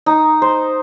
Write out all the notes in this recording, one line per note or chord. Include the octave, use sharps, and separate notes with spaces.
D#4
C5